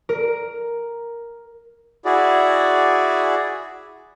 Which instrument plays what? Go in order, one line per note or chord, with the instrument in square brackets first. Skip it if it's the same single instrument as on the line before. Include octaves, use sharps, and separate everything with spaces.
[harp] A#4
[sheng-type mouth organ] E4 F#4 G#4 D5